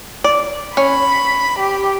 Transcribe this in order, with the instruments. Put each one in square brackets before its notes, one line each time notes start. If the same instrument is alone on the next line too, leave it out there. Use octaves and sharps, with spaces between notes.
[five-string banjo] D5
[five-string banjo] C#4 [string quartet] B5
[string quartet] G4